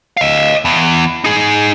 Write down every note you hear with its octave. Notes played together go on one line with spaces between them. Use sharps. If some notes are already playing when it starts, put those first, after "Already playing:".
D#5 F5
E2
D#4 G#4